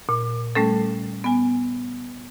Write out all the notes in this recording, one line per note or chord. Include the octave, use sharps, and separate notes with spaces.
A#2
G3 A3 C#4 A4
B3 G#5